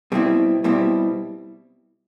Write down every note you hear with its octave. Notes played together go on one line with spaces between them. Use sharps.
B2 G3 C4 E4
B2 G3 C4 E4